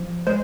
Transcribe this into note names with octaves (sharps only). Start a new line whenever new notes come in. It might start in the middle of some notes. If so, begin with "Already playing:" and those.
Already playing: F3
G#3 C5